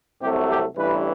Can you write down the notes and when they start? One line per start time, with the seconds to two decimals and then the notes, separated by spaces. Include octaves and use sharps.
0.21 C2 C3 F#3 A3 G4
0.49 G4
0.77 A1 G2 E3 B4